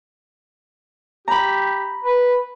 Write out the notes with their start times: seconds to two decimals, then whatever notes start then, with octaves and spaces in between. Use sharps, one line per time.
1.28 G4 A#5 B5
2.04 B4